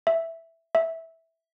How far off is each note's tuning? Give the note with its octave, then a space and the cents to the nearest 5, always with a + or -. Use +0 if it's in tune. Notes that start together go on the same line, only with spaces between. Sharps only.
E5 +0
E5 -10